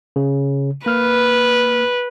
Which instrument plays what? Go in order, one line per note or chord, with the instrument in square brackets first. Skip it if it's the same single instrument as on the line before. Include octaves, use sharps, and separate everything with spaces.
[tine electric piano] C#3
[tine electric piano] A#3 F6 [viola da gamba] B4